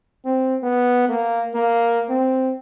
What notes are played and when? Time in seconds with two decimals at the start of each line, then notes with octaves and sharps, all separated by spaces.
0.25 C4
0.63 B3
1.09 A#3
1.54 A#3
2.09 C4